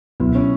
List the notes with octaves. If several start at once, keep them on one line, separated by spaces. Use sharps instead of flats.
C#2 B2 F#3 B3 E4
C#4